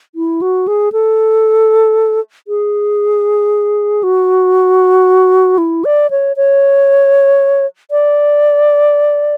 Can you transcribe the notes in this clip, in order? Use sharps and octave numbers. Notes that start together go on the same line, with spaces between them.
E4
F#4
G#4
A4
G#4
F#4
E4
D5
C#5
C#5
D5